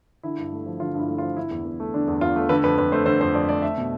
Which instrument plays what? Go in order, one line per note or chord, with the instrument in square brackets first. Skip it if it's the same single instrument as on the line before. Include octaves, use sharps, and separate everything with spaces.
[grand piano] D3 E4
G2
A3
F3
D3 F4
G2 E4
A3
F4
F3
D3 E4
E2
E2
A3
D3 D4
E2
E2 F4
A3
D3 B4
F2 B4
F2 B4
A3 C5
D3 C5
F2 C5
F2 D5
A3 D5
A3 E5
B2